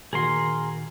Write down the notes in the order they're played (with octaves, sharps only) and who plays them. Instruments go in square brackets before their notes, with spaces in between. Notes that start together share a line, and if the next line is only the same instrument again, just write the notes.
[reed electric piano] A#2 D#3 F#4 [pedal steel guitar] G#4 A#4 C6